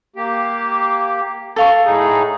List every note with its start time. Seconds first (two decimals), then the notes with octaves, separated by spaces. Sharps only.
0.16 A#3 G4
1.56 A4 F5 C#6
1.85 A2 D#4 G#4